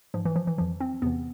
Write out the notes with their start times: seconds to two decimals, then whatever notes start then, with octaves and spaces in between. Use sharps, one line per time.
0.14 G#2 E3 F3
0.25 E3
0.36 F3
0.47 E3
0.58 F2 E3 F3
0.80 C4
1.02 E2 C3 E3 B3